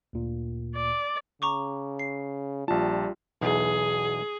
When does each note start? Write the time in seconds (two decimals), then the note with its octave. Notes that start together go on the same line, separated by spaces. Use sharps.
0.13 D2 A#2
0.76 D5
1.42 C#3 A#5 C#6 D6
1.99 C7
2.68 A#1 G3 F4 A5
3.41 B1 E2 G#4